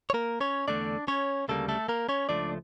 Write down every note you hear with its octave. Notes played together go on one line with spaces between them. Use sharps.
C#5
A#3 A#4
C#4 C#5
E2 D3 A3 D4 D5
C#4 C#5
D2 C#3 G3 A3 A#3 A4
A3 A4
A#3 A#4
C#4 C#5
C#2 C#3 F3 A3 D4 D5